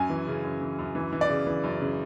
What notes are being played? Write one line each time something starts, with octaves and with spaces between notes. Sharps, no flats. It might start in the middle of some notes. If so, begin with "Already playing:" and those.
Already playing: F#2 G#5
E3
C#3
F#2
E3
F#2
E3
E3
D5
C#3
E3
F#2
C#3